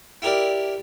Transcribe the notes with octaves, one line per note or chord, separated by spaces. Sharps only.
E4 G4 A#4 D5